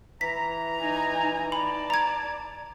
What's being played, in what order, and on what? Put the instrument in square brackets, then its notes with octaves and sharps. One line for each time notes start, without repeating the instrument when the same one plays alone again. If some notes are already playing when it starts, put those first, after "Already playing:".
[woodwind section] E3 A#5 [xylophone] B6
[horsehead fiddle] D#4 G#5
[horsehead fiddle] D5 A5 [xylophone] B5
[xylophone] A#5 G#6